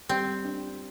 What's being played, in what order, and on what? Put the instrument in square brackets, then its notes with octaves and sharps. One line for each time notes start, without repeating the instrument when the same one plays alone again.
[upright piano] G3 [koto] C4
[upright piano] D4